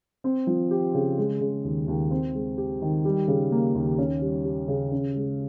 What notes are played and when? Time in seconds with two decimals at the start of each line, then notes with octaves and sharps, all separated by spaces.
0.24 C4
0.47 F3
0.71 G4
0.94 C#3
1.18 G#3
1.41 C#3
1.64 D#2
1.88 D#2
2.11 C4
2.35 G#3
2.57 G4
2.82 D#3
3.05 G3
3.28 C#3
3.52 A#3
3.75 D#2
3.98 C#4
4.22 G3
4.45 G4
4.68 C#3
4.92 C#4
5.16 G#3